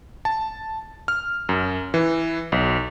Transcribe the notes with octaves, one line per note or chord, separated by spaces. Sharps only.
A5
F6
F#2
E3
B1